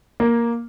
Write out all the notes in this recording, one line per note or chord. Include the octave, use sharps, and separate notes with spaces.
A#3